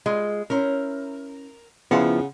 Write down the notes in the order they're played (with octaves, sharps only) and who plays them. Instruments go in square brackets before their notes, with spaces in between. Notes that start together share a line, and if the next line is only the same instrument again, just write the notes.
[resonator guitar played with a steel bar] G#3 [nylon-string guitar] F4
[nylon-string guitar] C#4 E4 C5 [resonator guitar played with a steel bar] A#4
[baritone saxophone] C#3 [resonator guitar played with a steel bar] F3 [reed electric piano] B3 E4 F4 [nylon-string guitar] F#5